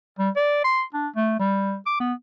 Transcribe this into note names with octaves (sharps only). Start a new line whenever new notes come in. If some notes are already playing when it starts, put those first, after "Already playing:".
G3
D5
C6
D4
A3
G3
D6
B3